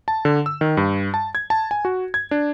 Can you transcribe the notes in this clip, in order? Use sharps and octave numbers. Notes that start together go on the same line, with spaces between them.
A5
D3
E6
D#3
G2
A5
G#6
A5
G#5
F#4
G#6
D4